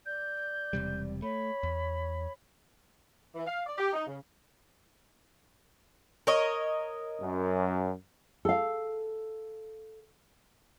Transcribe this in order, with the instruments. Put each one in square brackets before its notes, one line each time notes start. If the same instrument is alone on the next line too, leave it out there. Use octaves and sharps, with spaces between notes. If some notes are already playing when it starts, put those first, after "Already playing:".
[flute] D5 [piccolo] G6
[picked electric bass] E1 C3 G3
[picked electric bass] A3 [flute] C#5 [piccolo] B5
[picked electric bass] E2
[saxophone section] E3
F5
D5
G4
D#4
C#3
[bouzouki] A#4 C#5 D#5
[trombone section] F#2
[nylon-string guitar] A4 F5